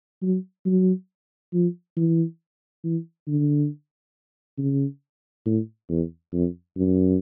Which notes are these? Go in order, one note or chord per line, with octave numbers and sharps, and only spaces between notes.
F#3
F#3
F3
E3
E3
D3
C#3
A2
E2
F2
F#2